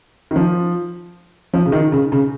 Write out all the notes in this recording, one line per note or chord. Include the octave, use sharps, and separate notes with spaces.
D#3
F3
F3
C#3
D#3
C#3
C#3